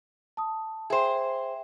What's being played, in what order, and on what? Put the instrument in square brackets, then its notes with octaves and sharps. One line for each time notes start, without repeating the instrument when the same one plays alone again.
[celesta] A5 D#6
[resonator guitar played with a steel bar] G#4 C5 [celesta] E5 G5